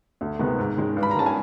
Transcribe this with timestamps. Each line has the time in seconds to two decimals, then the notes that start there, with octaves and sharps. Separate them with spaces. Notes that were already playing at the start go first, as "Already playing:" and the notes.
0.21 D2
0.39 C3 D#3 G#3 B3
0.59 G#2
0.77 D#3 G#3 C#4
0.97 G2
1.03 B5
1.11 A#5
1.15 D#3 G#3 C#4 A5
1.26 G#5